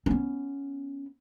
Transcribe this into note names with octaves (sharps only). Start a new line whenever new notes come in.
B3 C#4